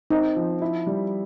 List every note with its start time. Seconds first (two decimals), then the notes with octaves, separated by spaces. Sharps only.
0.11 C4 D#4
0.36 F3
0.62 E4
0.86 G3